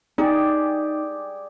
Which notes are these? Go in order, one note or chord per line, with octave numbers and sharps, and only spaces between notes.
D#4 G4 G#4 D5